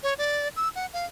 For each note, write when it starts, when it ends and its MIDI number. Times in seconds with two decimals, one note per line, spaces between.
0.03 0.14 73
0.18 0.48 74
0.56 0.69 88
0.75 0.86 78
0.93 1.06 77